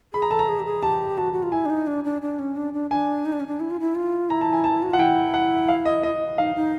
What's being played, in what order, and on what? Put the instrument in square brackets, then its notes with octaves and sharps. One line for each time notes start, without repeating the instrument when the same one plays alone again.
[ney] G#4 [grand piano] B5
[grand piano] A#5
[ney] A4 [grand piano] A5
[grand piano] A#5
[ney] G#4
G4
G#4
[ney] G4 [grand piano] A5
[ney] F#4 [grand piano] A5
[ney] F#4
F4
[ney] E4 [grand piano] G#5
[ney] D4
D#4
D4
D4
D4
C#4
D4
D4
[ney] D4 [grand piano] G#5
[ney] D#4
D4
C#4
D4
E4
F4
E4
F4
[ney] E4 [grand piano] A#5
[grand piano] A5
G#5
A5
[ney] F#4
[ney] F4 [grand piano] F#5
[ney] E4 [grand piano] G5
[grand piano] F#5
F5
D#5
D#5
[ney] D#4 [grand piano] F5
[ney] D#4